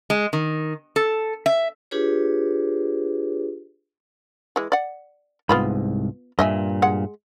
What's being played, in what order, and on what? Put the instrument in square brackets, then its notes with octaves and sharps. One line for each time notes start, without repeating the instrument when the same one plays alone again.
[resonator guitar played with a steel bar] G#3
D#3
A4
E5
[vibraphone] D4 F4 G4 G#4 B4 C#5
[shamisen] E3 G#3
D5 F#5
[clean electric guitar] C2 G#2 [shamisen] B3 F4 B5
[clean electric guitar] G2 A#2 [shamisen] D#5 E5 G#5
[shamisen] G#3 F#5